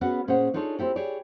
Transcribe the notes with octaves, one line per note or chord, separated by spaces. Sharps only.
B3 C#4 F#4 G#4 B4 F#5
A#2 C#4 G#4 C5 C#5 F#5
D4 D#4 F4 G#4 A4 C#5
C4 E4 G4 A4
G4 G#4 C#5 D5